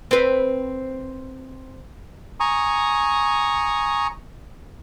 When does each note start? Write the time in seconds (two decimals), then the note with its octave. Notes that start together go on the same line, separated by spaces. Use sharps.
0.11 C4 B4
2.40 G#5 A#5 C#6 D#6